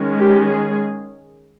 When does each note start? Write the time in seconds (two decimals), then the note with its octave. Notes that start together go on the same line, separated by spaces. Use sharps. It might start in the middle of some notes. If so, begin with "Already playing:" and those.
Already playing: D#3 G#3 C#4
0.17 G4
0.48 G#4